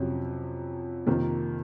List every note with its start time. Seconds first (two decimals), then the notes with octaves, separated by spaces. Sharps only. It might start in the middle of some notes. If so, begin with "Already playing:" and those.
Already playing: F2 C3 F#3 C#4
1.07 F2 C3 D#3 A#3